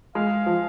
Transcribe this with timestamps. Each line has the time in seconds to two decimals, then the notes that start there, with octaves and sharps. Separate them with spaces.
0.15 G#3 F5
0.46 F3